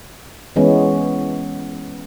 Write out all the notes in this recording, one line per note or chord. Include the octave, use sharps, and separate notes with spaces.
E3 G#3 B3 C#4